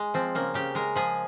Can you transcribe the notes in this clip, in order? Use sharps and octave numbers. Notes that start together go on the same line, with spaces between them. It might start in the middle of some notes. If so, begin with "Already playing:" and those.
Already playing: G#3
F3 C4
C#3 A#3
C#3 G4
G#3 A#4
F3 G#4